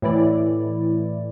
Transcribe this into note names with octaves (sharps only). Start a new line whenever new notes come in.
A2 E3 E4 D5